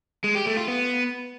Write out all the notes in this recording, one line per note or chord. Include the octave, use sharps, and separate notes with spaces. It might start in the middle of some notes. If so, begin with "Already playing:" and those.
G#3
G4
A3
F4
B3